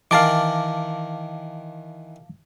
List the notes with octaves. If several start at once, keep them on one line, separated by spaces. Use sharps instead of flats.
D#3 E3 A#4 F5 A5 D6